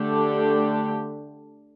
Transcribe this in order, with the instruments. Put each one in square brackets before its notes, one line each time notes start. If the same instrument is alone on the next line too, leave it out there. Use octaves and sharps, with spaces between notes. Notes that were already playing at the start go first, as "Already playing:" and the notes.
Already playing: [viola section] D3 A3 D4 G4